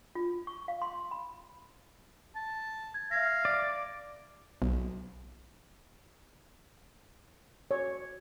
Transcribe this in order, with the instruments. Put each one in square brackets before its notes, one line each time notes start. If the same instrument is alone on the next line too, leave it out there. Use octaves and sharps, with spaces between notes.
[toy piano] F4
C#6
F5
C6
B5
[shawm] A5
[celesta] G#6
[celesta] E5 G#6 A#6 [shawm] F5
[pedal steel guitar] D5
[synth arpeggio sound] B1
[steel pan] C#5